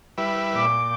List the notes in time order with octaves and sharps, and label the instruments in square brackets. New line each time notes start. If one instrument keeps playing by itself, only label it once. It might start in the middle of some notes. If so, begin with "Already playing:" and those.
[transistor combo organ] G3 E4 B4
[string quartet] A#2 D6 G6